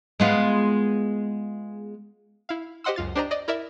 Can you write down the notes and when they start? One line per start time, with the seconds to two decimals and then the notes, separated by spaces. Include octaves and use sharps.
0.20 G#3 B3 F4
2.49 E4 F5
2.84 G4 C5 D#5 F#5 C6 E6
2.96 C#2 F#2 F4 A6
3.15 D4 G4 C5 D5 D#5 A#5
3.31 D5 D#5
3.48 E4 A#4 D5 E5